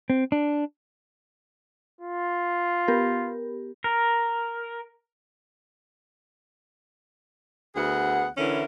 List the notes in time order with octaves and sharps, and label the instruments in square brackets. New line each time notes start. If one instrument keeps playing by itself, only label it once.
[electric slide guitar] C4
D4
[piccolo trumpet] F4
[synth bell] B3 G4 A#4
[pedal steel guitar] A#4
[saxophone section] D2 B3 G#4 F#5
D3 E3 C#4 E4 A#4